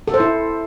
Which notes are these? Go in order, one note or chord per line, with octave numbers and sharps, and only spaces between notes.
A4
C5
E4